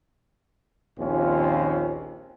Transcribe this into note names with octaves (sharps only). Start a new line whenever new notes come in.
A#1 D#2 C4 C#4 F4